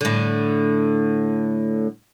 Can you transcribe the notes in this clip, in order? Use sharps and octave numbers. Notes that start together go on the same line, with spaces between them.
A2 D3